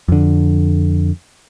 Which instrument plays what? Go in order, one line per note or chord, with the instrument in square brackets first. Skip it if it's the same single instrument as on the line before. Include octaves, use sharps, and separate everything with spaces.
[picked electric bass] F2 D3